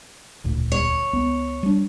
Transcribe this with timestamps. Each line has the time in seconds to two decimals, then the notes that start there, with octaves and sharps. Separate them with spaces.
0.44 E1 D2 A#2
0.72 C#5
1.13 C#2 B3
1.63 G3 D4